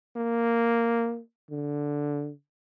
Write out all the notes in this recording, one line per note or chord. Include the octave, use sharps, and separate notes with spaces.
A#3
D3